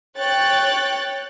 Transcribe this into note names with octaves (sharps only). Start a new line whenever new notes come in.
C#5 G5 F#6 A6